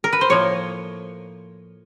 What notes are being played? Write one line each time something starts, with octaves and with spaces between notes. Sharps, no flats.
A#4
B4
C5
A2 F3 A#3 C#5